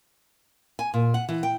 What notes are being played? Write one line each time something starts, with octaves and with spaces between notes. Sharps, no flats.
G#5
A#2
F#5
E3
G5